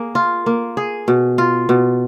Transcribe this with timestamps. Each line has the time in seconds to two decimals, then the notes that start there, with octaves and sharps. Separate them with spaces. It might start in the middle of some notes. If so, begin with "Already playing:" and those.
Already playing: A#3 G#4
0.15 F4
0.46 A#3
0.77 G#4
1.08 B2
1.38 F4
1.69 B2